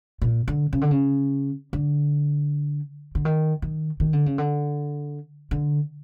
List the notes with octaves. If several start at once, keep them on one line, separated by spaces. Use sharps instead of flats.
A#2
D3
C#3
D3
C#3
D3
D3
D#3
D#3
D#3
D3
C#3
D3
D3